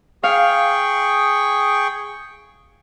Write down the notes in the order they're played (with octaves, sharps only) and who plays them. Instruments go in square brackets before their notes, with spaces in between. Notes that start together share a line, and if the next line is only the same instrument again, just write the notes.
[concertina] G#4 G5 C#6 [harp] F5